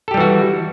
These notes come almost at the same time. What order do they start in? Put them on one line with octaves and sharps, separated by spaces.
A4 G4 G3 E3 F#4